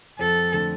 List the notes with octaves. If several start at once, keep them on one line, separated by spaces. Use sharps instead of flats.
F2 A4
D3 A3